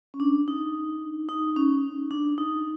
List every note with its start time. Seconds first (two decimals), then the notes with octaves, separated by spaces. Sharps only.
0.14 C#4
0.20 D4
0.48 D#4
1.29 D#4
1.56 C#4
2.11 D4
2.38 D#4